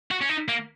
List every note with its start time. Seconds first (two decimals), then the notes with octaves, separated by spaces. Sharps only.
0.11 F#4
0.22 C#4
0.29 D#4
0.49 A#3